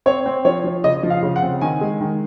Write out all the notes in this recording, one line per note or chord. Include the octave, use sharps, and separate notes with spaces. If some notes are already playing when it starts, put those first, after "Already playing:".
C4 C#5
C4
F3 C#5
F3
C#3 D#5
F3
F5
C#3
F#5
C4
D#3 G#5
G#3
D#3